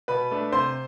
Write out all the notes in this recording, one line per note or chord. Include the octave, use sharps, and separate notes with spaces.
B2 B4 B5
A3 D4
C3 C5 C6